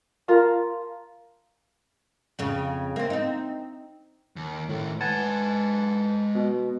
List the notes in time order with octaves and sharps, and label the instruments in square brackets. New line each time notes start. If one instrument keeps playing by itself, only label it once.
[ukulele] F4 A#4 A5
[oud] F2 C#3
A#3 C4
C4 D#4
[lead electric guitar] D#2
[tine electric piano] A2 [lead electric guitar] D#3 A3
[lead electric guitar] G#3 F#5 [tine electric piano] B4 G#5 A5
[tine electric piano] B2